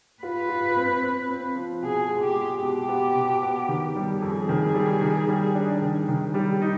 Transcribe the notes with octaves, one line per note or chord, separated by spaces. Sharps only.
F4 B4
F4
C4
C4
C4
F3
B2 G#4
G#3
G4
G#3
B2 G4
B3
B2
B3
D#3
G3
F2 G#4
D#3
G3
D#3
G3
D4
D#3
D#3
G3
D#4